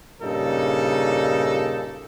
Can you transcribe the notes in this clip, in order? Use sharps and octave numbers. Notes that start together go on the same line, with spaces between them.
G2 A#2 C#3 D#4 A4